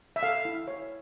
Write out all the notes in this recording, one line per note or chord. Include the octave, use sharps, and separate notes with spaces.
E5
A4 F5
E4
C#5